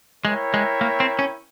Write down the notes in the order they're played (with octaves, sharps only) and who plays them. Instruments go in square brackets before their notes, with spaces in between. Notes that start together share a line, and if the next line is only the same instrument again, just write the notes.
[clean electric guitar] G#3 [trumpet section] E4 A#4 C#5 E5 G5
[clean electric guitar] G#3
A#3
C4
C#4